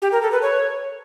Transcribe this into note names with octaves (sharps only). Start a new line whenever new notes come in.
G4
A#4
A4
B4
C#5